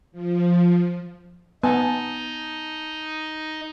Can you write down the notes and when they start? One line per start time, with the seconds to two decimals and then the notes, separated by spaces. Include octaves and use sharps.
0.12 F3
1.63 B3 D#4 G#5 A5